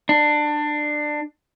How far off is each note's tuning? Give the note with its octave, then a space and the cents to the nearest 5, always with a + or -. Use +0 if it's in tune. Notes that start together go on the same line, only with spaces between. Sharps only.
D4 +20